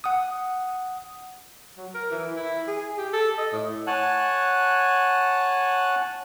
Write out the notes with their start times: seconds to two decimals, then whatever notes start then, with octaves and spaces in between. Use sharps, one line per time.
0.04 F#5 D#6
1.77 F#3
1.94 A#4
2.11 E3
2.36 E4
2.67 G#4
2.98 G4
3.13 A4
3.38 D#5
3.53 A2
3.87 C#5 F#5 G#5 A5 F#6